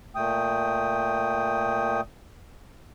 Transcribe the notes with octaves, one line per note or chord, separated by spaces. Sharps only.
A#2 A3 G5 D#6